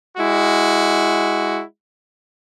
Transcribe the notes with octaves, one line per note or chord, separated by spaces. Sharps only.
G#3 E4 F#4